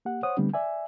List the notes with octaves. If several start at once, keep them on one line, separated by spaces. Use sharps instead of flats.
A#3 G4 F#5
C5 C#5 F#5 D#6
D3 G3 A3 B3 C4 D4
D5 E5 G#5